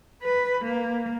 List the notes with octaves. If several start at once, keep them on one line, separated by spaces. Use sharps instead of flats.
B4
A#3